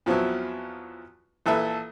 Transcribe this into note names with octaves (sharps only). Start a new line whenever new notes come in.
E2 F3 F#3 B3 C4 E4
A#1 E3 A4 B4 E5 E6